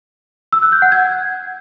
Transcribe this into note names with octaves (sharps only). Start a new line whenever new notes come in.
E6
F#6
G6
F#5
G#6